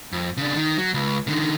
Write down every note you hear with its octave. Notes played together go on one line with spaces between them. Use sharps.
F2
C#3 D4
D#3
F#3
C#2
D3 D#3